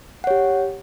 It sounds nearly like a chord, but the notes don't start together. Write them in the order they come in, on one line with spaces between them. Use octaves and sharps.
F#5 C#5 G4